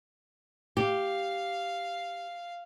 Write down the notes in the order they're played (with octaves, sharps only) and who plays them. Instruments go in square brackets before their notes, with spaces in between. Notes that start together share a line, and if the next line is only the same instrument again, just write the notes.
[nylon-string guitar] G4 [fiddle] F5